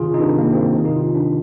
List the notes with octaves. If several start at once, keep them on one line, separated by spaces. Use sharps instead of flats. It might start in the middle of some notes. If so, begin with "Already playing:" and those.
Already playing: C3 D#3 F4 G#4
D#4
C3 D#3 D4
A#3
C4
A#3
C3 D#3
D#4
F4
D4